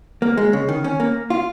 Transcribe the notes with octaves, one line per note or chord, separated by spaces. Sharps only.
A#3
G#3
C#3
D#3
C#4
A#3
F4